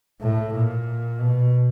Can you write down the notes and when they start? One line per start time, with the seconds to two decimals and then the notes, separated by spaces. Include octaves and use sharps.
0.21 A2
0.53 A#2
1.19 B2